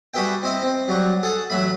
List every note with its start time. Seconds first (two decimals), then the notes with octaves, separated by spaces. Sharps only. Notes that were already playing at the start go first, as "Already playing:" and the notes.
0.14 G3 F#4 G#4 B4 E5 G5
0.43 C4 E4 D#5
0.62 C4
0.88 F#3 G3 F#4
1.23 G#4 A4 F#5
1.50 A1 F#3 E5 B5